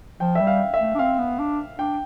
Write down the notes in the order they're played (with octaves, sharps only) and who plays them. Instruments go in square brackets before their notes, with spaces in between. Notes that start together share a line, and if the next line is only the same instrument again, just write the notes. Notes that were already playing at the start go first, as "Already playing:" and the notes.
[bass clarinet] F3 [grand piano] G5
[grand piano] E5
[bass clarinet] G3
[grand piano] F5
E5
[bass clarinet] A3
D4
[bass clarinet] C4 [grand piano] F5
[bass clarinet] B3
D4
[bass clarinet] D4 [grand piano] G5